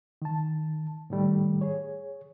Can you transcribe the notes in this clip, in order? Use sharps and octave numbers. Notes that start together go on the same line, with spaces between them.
D#3 A5
A2 D#3 G3 A3
G#4 C#5